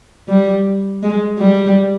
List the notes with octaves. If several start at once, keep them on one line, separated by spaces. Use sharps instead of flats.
G3
G#3
G3